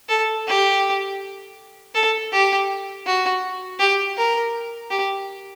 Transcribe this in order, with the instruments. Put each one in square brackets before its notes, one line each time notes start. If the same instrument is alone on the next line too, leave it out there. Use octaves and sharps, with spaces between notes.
[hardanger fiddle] A4
G4
A4
G4
F#4
G4
A#4
G4